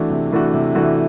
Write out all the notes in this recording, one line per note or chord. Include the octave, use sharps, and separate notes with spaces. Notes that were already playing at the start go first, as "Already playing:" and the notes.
Already playing: E3 A3 D4 F#4
C3
E3 A3 D4 F#4
C3
E3 A3 D4 F#4